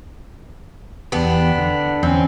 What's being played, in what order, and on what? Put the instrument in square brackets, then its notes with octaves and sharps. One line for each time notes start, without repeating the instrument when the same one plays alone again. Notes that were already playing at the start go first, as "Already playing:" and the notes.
[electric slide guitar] E2 G4 [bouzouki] B3 D4
[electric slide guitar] D3
[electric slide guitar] E2 C#4 G#5 [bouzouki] C4